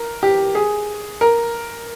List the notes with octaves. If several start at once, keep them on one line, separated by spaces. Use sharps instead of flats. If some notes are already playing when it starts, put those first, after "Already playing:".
Already playing: A#4
G4
G#4
A#4